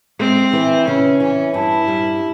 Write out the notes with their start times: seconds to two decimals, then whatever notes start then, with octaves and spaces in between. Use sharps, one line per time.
0.20 G#3 C4
0.53 E3
0.87 C#3 C#4
1.20 E3 C#4
1.54 G2 E4
1.88 G3